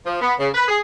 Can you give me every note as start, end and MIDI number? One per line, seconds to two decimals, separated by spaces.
0.06 0.20 53
0.22 0.34 59
0.40 0.49 49
0.54 0.65 71
0.68 0.80 68